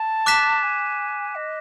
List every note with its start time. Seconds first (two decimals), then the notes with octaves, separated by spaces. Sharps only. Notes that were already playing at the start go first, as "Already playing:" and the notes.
Already playing: A5
0.26 D6 F#6 B6 E7
0.63 G#5
1.35 D#5